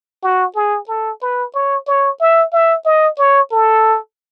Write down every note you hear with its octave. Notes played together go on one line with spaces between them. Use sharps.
F#4
G#4
A4
B4
C#5
C#5
E5
E5
D#5
C#5
A4